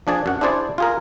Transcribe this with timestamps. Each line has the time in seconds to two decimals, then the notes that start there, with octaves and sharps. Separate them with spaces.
0.07 F3 D4 G#4 D5
0.26 F#2 F#5
0.41 D4 E4 G#4 C5 D5
0.78 F4 G#4 A#4